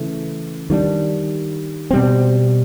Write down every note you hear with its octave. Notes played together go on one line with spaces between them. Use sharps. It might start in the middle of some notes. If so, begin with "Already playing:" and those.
Already playing: C#3 E3 A3
D#3 G3 A#3 D4
B2 G3 C4